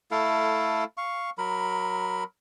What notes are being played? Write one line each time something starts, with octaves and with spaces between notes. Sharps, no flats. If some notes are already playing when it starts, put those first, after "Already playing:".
A3 E4 A4 F5
F5 C#6
F#3 A#4 B5